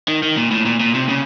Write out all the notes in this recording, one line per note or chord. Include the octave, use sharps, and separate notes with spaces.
D#3
D#3
A#2
A2
A#2
A#2
C3
C#3